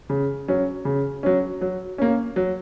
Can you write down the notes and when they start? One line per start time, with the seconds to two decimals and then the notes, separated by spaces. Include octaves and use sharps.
0.10 C#3
0.48 F#3 C#4
0.85 C#3
1.23 F#3 C#4
1.61 F#3
1.98 A#3 C#4
2.36 F#3